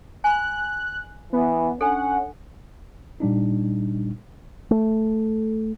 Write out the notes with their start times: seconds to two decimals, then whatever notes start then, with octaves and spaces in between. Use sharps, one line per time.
0.24 G#5 B5 F#6
1.33 E3 B3
1.81 C#4 D4 A4 F#5
3.20 A#2 G3 D4 D#4
4.71 A3